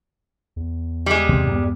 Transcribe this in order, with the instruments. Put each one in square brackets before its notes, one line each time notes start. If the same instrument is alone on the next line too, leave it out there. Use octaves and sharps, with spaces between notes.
[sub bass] E2
[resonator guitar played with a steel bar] G3 G#3
[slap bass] D#2 C3
G2 A#3 B3